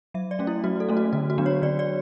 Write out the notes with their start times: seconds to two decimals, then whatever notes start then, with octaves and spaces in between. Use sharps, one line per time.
0.14 F#3 E5
0.31 D5
0.39 A3 C#4
0.47 E4
0.64 F#3 F#4
0.80 A4
0.88 A3 C#4
0.97 F#4
1.13 D3 F#4
1.30 F#4
1.38 F#3 B3 D4
1.46 C#5
1.62 D3 D5
1.79 D5